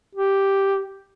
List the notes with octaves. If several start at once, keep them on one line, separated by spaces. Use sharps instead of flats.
G4